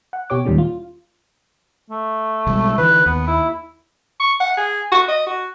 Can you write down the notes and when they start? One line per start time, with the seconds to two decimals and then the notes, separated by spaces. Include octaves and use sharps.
0.13 F#5
0.30 B2 G4 C#5 D6
0.45 D#2 A#2 D#3 G3 G#3 C#4
0.58 F4
1.90 A3
2.47 B1 G3 G#3
2.78 D3 E3 B4
3.06 D#2 B3
3.27 E4
4.20 C#6
4.40 F#5
4.57 G#4
4.92 F#4
5.08 D#5
5.27 F#4